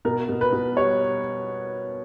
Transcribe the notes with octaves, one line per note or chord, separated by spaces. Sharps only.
B2 A#4
B2
B4
B2
G3 C#5